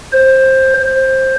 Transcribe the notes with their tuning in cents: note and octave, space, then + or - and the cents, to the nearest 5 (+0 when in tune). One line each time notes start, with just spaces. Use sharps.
C5 +15
C5 +15